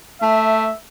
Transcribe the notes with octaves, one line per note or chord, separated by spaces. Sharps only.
A3 E5